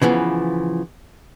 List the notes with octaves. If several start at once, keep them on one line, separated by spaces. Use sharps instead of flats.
C#3 E3 F3 B3